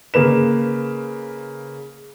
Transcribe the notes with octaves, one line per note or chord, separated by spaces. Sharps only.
C#3 A#3 B4 E7